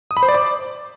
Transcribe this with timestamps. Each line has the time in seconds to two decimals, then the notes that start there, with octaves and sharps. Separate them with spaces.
0.11 D#6
0.17 B5
0.23 C5
0.29 D5
0.34 D6